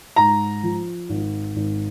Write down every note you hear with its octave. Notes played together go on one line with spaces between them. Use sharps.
G#2 A#5
F3
G#1
G#1